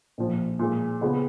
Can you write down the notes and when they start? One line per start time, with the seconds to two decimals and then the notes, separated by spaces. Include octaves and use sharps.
0.18 A#1 A#2 F3
0.59 A#2 F3 G#3
1.01 C#2 C#3 G#3 B3